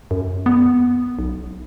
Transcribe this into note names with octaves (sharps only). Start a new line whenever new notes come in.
F#2
B3
B1